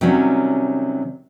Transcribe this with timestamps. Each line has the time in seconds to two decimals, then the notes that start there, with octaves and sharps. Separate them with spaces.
0.01 C3 D#3 F#3 G3 C#4